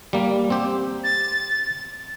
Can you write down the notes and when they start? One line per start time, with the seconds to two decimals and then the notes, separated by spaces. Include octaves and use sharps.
0.13 G3 A#3
0.50 C4 G4
1.04 A6